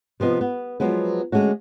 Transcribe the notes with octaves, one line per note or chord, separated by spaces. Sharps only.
C3 F3 B3 D#5
B3
F3 F#3 G#3 B3
D3 G#3 A3 C#4 F#4